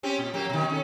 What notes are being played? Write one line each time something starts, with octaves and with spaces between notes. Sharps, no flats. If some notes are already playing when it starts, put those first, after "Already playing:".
C4 C#4 G4
A#2
F#3 A#3 G4
B2 D#3
C#4 A4